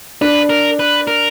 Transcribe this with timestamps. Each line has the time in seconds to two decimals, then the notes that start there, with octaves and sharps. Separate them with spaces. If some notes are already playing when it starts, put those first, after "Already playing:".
0.21 D4 B4
0.49 A#4
0.79 B4
1.07 A#4